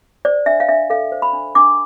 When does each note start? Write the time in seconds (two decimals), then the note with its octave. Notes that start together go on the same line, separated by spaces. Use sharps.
0.25 C5 D5
0.46 D4 E5
0.60 F5
0.69 D4 E5
0.90 A4 F5
1.12 C5
1.22 B5
1.33 D4
1.55 D4 D6